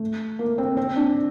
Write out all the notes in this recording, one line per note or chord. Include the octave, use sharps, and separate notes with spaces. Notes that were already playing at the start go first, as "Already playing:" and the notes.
Already playing: A3
A#3
C4
C4
D4